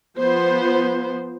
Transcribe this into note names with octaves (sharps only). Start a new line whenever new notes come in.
F3 B3 C5